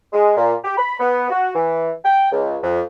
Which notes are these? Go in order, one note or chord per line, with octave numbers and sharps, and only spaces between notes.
G#3
A#2
G4
B5
B3
F#4
E3
G5
C#2
F2